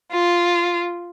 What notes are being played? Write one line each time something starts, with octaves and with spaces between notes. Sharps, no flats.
F4